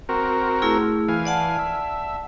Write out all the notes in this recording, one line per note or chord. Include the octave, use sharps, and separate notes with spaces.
C4 F#4 A#4
A3 E4 G#4
E3 F5 G#5
D5 F#5 A5
E5